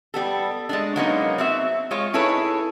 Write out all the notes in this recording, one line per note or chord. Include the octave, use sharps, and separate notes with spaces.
G3 B3 A4
G#3 A3 D4
F#3 G#3 A#3 B3 C#4 D#4
C4 F#4 E5
G#3 F4 C#5 F5
D#4 E4 G#4 A4 B4 C#5